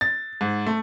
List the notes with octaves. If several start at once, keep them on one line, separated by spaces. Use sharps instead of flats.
A6
G#2
A3